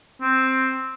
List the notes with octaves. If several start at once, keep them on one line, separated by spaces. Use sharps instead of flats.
C4